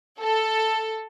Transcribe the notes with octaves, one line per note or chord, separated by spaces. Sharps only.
A4